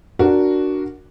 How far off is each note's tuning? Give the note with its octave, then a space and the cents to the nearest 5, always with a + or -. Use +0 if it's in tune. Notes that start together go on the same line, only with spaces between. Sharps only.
D4 +0 F#4 +0 A#4 +0